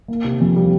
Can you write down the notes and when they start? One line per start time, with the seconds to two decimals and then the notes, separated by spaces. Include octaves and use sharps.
0.08 A#3
0.24 C3
0.41 F2
0.56 G3